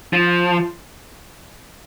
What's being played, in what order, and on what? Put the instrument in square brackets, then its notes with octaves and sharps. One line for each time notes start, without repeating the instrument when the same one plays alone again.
[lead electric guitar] F3